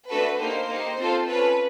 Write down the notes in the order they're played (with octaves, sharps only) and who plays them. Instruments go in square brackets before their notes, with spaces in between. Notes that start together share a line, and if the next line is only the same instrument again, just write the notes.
[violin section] A3 D4 F#4 A4 B4
A#3 D#4 G4 C5
A#3 D#4 G4
C4 F4 A4
C#4 F4 A4 B4